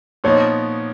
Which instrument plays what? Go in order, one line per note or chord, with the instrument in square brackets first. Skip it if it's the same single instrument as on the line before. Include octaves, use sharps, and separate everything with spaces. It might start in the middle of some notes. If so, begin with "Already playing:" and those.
[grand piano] A#2 F3 B3 D#4 [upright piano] C#5